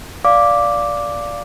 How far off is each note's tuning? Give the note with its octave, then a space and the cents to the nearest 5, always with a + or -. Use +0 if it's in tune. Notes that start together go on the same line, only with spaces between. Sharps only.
D5 -10 F5 +0 D6 +0